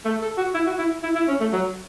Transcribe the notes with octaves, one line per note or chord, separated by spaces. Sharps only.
A3
A4
F#4
E4
F#4
E4
E4
E4
C#4
A3
F#3